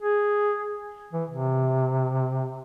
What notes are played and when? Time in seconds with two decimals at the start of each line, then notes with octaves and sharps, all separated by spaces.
0.02 G#4
1.13 E3
1.29 C3